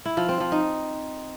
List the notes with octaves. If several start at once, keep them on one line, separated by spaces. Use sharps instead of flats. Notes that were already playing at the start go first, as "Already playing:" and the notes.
E4
F3
C4
F3
D#4